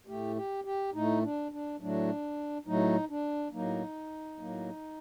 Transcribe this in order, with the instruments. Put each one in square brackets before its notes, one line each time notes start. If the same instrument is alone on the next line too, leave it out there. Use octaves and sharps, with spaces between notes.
[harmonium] A2 A3 G4
G4
G4
A2 A3 D#4
D4
D4
A2 F#3 A3 D4
A2 F#3 A3 D#4
D4
A2 F#3 A#3 D#4
A2 F#3 A#3